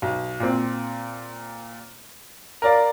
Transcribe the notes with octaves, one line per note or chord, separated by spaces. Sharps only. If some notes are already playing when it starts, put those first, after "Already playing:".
B1
A#2 C4
A#4 D5 F5